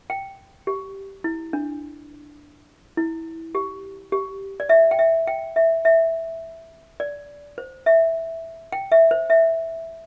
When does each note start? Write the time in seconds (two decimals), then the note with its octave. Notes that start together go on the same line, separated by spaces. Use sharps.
0.10 G5
0.67 G4
1.24 E4
1.53 D4
2.97 E4
3.55 G4
4.12 G4
4.60 D5
4.69 E5
4.91 G5
4.99 E5
5.27 G5
5.56 E5
5.85 E5
7.00 D5
7.58 C5
7.86 E5
8.72 G5
8.92 E5
9.11 C5
9.30 E5